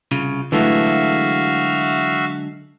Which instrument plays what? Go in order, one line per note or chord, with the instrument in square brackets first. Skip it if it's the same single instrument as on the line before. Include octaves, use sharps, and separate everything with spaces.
[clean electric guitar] C2 C#3 F4
[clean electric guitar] D3 F#3 G#3 [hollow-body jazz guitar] E3 A3 [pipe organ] F#4 E5 F5